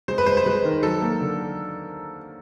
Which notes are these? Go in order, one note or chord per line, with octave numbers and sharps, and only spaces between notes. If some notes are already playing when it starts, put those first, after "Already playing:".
G#3 C5
B4
G#3 C5
C5
G#3 B4
D#3
F#3 A4
A#3
D3